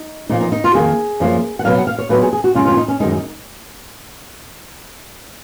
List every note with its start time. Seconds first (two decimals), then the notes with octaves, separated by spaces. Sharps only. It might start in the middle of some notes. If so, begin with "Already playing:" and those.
Already playing: D#4
0.29 A#2 F3 A#3 D#4
0.41 D#4
0.52 D#4
0.64 F4
0.74 F2 D#3 A#3 G#4
1.20 F#2 F3 A#3
1.59 F#5
1.64 B2 F#3 B3 F5
1.78 F#5
1.87 F5
1.98 C#5
2.09 A#2 F#3 B3 B4
2.22 G#4
2.33 G#4
2.44 F#4
2.55 F2 C#3 G#3 C#4 F4
2.66 F4
2.72 C#4
2.77 D#4
2.88 C#4
3.00 F#2 D#3 G#3 D#4
3.12 D#4